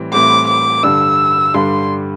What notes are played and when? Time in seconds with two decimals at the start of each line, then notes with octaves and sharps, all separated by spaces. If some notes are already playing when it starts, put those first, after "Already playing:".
Already playing: A2 E3 G3 C4
0.12 A2 E3 G3 C4 D6
0.48 D6
0.83 G2 D3 G3 D4 E6
1.54 G2 D3 G3 D4 C6